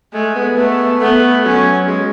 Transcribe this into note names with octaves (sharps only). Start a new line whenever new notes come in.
G#3 A3
B3
A3 B3
A3 B3
F#3 C#4
G#3